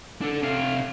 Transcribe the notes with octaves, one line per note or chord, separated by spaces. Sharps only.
D4 A4
C3 F5